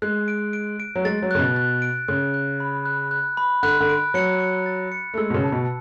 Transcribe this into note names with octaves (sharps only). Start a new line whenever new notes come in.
G#3 F#6
D7
D7
D7
F#3
G#3 A6
F#3
C#3 F#6
B2
F#6
D7
C#3 F#6
F#6
B5
F#6
F#6
B5
D3 F#6
D3
D7
F#3 C#7
C#7
A6
C#7
A3
G#3 E6
B2
C#3
A5
B2